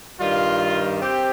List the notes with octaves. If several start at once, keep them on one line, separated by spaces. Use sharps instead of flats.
G2 D#3 G3 F4
C4 G4